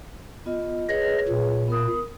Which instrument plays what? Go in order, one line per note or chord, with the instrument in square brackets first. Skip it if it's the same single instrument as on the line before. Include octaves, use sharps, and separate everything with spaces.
[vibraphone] B3 F4 D#5
[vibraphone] G#4 B4 C#5 [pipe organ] D#5
[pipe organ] A#2
[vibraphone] B3 A#4 D#6